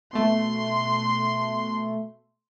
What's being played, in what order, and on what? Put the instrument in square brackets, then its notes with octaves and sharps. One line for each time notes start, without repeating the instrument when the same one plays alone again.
[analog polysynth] B2 A3 [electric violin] C6